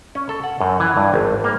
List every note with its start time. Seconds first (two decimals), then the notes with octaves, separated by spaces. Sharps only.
0.15 C#4
0.29 A4
0.44 F#5
0.60 F#2
0.80 E3
0.97 G2
1.14 G#1
1.44 A#3